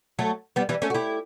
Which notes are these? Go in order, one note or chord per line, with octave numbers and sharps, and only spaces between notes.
F#3 A3
G3 B3
E3 G3
A3 C#4
F#4
E4 G4